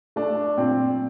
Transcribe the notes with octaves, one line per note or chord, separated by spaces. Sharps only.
A3 D4
A#2 C4